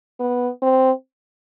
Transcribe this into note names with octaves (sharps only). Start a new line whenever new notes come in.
B3
C4